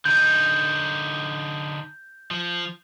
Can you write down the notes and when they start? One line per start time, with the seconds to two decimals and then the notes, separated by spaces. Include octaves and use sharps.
0.05 D3 D#4 G6
2.31 F3